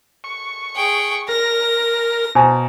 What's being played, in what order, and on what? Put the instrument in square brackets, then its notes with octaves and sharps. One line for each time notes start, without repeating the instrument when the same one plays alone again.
[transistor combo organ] C#6
[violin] G#4 G5
[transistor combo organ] A#4 [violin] A#6
[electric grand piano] B2 [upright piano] C5 G#5 A#5